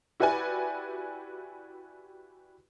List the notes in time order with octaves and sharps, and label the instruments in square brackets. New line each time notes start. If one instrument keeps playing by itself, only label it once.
[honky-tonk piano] E4 F#4 G4 B4 D5 G#5